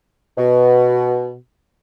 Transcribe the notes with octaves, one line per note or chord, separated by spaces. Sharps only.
B2